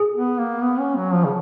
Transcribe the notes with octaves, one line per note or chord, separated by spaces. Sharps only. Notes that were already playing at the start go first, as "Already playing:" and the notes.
Already playing: G#4
B3
A#3
B3
C#4
F#3
F3
C#3